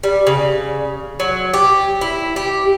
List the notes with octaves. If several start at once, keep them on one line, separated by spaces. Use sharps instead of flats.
G3
C#3
F#3
G4
E4
G4